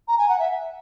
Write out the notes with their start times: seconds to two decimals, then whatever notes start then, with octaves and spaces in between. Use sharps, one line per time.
0.08 A#5
0.18 G#5
0.28 F#5
0.39 E5